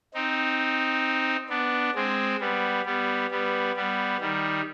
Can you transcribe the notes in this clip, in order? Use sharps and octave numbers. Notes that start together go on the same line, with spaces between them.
C4 D#4
B3 D4
G#3 C4
G3 B3
G3 B3
G3 B3
G3 B3
D#3 G3